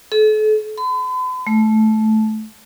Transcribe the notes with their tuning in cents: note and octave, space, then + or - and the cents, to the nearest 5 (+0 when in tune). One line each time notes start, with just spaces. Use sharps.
A4 -40
B5 +45
A3 -15